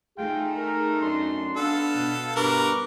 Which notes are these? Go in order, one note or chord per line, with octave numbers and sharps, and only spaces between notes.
A3 D#4 F4 G#4 G5
A#4
F#2 D4 C6
B3 D4 A4 F5
B2
G2 A#4 B4 C#6 D6